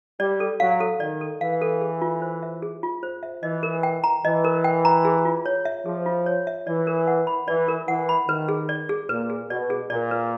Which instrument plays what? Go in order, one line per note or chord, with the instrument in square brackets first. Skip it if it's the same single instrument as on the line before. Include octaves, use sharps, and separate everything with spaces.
[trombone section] G3 [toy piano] D5
[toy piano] A4
[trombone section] F#3 [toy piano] F5
[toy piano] A4
[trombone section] D#3 [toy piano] D5
[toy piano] A4
[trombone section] E3 [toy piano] F5
[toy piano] A4
G#4
F4
C5
E5
G#4
F4
C5
E5
[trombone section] E3 [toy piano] D#5
[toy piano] A#4
G5
A#5
[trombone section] E3 [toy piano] D#5
[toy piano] A#4
G5
A#5
G#4
F4
C#5
E5
[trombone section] F3 [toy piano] G#4
[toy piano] F4
C#5
E5
[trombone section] E3 [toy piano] D5
[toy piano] A#4
F#5
B5
[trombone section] E3 [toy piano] D5
[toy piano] A#4
[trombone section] E3 [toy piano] F#5
[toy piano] B5
[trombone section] D#3 [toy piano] B4
[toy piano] G#4
D5
G#4
[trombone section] A#2 [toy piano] B4
[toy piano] G#4
[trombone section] B2 [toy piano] D5
[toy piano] G#4
[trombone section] A#2 [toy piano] D5
[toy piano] B4